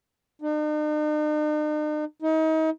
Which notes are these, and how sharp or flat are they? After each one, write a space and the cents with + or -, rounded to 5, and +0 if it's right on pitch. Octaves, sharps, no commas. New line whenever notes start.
D#4 -45
D#4 +35